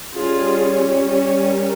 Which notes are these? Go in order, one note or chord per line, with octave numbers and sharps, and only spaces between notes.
G3 C#4 F4 G#4
G4 A#4